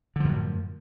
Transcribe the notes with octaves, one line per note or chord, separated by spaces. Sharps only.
F#2 A2 D3 F3